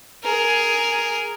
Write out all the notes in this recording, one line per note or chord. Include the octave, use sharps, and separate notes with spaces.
G#4 A#4